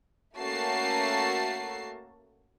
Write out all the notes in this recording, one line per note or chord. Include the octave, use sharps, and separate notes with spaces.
A3 A#3 C#4 F#4 A5 C7